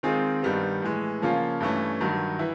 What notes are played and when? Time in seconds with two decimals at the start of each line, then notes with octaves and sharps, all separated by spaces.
0.03 D#3 G#3 C4 F4 G#4
0.42 G2 D#3 G3 B3
0.82 A2 E3 G#3
1.22 C#3 F3 A#3 C#4 F4
1.60 G2 E3 A3 C#4
2.01 G2 D#3 F#3
2.39 E3 E4